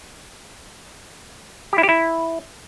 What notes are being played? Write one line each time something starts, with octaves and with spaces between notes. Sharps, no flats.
G4
E4
G4
E4